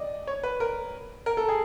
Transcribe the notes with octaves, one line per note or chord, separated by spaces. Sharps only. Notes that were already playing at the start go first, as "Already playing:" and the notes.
Already playing: D5 D#5
C#5
B4
A#4
A#4
A4
G#4